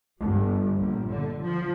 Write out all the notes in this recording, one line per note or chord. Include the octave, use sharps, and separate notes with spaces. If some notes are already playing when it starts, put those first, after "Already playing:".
G1
A#1
D3
F3